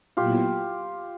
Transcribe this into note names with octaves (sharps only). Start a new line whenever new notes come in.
A#2 F#3 B3 E4 F4 G4